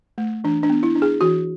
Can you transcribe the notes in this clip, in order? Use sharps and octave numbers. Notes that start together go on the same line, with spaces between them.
A3
E3 D4
D4
B3
E4
D4
G#4
E3 F#4